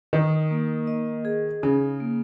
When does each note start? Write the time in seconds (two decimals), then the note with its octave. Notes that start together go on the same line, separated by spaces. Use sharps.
0.13 D#3 D#4
0.51 A#3
0.87 D#5
1.25 G#4
1.62 C#3 D#4
2.00 A#3